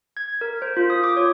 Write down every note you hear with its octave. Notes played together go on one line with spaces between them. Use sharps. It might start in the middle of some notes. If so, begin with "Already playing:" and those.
G#6
A#4
C5
F4
D#6
D6
C#5